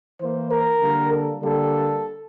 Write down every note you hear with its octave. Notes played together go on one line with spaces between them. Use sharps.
E3 A#3 C5
A#4
D3 G3 A#3
A4
D3 G3 A#3 A4